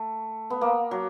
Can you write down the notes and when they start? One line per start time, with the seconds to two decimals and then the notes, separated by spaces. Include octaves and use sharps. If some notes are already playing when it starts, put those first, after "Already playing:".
Already playing: A3
0.50 B3
0.61 A#3
0.91 F#3